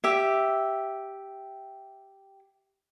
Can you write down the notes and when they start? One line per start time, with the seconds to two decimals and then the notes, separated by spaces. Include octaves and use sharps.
0.04 G4 E5